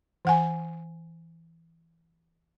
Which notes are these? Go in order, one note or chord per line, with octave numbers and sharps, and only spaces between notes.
E3 F#5 G#5